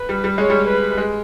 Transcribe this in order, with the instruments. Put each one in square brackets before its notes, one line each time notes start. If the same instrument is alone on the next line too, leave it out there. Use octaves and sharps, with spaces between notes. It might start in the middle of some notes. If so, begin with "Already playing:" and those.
Already playing: [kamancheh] B4
[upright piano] G3
G3
[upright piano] G#3 [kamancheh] C#5
[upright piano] G3
[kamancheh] B4
[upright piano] G#3